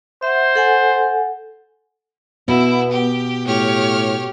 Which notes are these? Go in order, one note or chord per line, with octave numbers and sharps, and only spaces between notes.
C5 E5 F#5
A4 F#5 G#5
B2 B3 E4
G4
A2 G4 C#5 F6